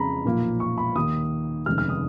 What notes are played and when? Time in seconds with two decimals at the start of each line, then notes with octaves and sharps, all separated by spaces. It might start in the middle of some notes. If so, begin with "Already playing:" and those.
Already playing: F2 C#3 G#3 A#5 B5
0.25 B1 A#2 F3 A#3
0.60 C#6
0.78 B5
0.95 D#2 D#3 A#3 D#6
1.66 F1 D#2 C#3 G#3 F6
1.78 F6
1.89 D#6